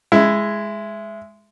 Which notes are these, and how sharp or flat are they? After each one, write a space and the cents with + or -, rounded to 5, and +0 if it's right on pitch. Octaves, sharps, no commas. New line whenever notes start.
G#3 +0 E4 +10